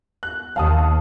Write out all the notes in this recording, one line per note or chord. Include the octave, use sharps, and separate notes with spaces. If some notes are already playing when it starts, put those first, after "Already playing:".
F#6
D#2 F5 A5 D#6